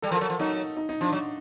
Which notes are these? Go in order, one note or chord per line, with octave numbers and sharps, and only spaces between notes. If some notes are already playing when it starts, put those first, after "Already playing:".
G3 A4
F3 A#4
F#3 A4
F3
F#3 D#4
D#4
D#4
F3 D4
F#3